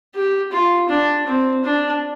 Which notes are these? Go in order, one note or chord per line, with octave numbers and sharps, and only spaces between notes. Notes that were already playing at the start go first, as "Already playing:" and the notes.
G4
F4
D4
C4
D4